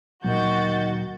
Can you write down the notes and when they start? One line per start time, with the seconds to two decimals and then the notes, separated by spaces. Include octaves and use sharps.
0.24 D2 A#2 D#3 F#3 F#4 G6 A6